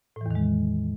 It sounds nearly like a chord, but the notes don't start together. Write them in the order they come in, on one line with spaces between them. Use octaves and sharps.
A2 E3 E2 D#3 G#3